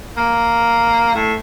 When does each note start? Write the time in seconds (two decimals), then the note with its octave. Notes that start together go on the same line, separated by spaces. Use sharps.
0.17 A#3
1.14 A2